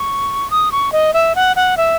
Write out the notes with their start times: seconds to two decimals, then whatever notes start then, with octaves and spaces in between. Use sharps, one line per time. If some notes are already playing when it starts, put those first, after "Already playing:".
Already playing: C#6
0.50 D#6
0.72 C#6
0.92 D#5
1.13 E5
1.35 F#5
1.56 F#5
1.77 E5